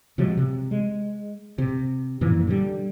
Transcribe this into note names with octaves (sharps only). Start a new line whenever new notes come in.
C3 F3 F#3 G#3
C3
G#3
C3
F#2 A#2 E3 F3
D3 G3